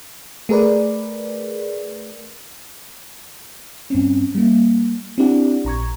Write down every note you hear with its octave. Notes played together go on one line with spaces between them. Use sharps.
A3 G#4 A#4 B4 D5
G2 C4 C#4
G3 A#3
C4 D4 E4 G4 D5 F#5
A#1 A#5 C#6 G#6